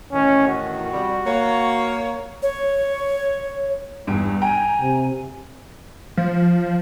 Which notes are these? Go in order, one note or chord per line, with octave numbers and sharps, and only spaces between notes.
E2 A2 D#3 C#4
F#4
F2 C3 G3
A#3 C#5
C#5
E2 G2 D7
G5 G#5 A#5 D7
C3
F3